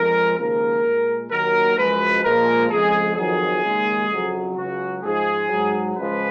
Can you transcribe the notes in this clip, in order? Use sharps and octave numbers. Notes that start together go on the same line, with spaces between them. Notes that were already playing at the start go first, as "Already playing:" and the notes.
Already playing: F2 F3 G#3 A#4
D#2 C#3 F3 G#3 A#4
A#2 G#3
D#2 D#3 F#3 A#4
F#2 F3 G#3 B4
A#2 F3 G#3 A#4
F2 C#3 G#3 G#4
F2 D#3 F#3 G#4
D#2 C#3 G#3
F2 C#3 F#3
C#2 C#3 F#3 F#4
G#2 F3 G#3 G#4
G#2 F#3
C#2 C#3 F3 G#3 B4